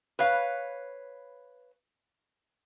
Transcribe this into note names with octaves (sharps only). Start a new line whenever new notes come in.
B4 C#5 F5